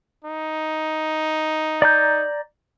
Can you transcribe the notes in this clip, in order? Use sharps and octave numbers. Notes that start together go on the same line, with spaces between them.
D#4
D5 A#5 G6